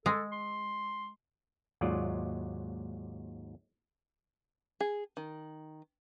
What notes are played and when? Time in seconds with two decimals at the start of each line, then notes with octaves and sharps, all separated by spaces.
0.06 G#3 A4
0.32 C6
1.81 D#2 G#2 F#3 F4 D5 D#5
4.80 G#4
5.17 D#3